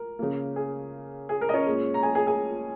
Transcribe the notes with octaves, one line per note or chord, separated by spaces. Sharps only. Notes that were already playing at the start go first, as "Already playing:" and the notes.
Already playing: A#4
C#3 A#3
G#4
G#4
A#4
D#5
C#4 C#5
A#2 G#3
A#5
G#4 G#5
G#4 G#5
G#4 G#5